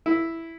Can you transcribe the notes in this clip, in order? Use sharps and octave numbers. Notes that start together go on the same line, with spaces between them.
E4